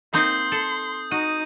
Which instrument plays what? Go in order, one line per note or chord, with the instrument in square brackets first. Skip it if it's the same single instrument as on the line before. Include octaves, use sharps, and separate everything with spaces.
[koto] A#3 C4 D#4 [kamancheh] C6 [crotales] D#6 G6
[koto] A4
[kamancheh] D#4 [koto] F#4 [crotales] D#7